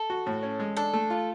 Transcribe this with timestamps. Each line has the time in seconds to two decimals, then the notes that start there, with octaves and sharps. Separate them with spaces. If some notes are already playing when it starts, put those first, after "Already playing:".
Already playing: A4
0.10 F#4
0.26 A2
0.43 C#4
0.60 G#3
0.77 D4 A4
0.93 A3
1.10 F4